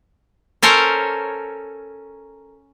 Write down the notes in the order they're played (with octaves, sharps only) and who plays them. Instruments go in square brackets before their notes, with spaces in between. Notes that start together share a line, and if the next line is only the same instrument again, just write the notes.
[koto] C#4 A4 A#4 C5 C#5